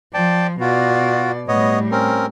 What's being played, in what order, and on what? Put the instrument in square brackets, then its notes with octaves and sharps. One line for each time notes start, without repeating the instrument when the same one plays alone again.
[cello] F3 [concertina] D5 G5 A5
[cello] B2 D5 [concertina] F4 F#4
[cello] A2 G3 [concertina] B3 C#5 D#5
[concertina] C4 C#4 A#4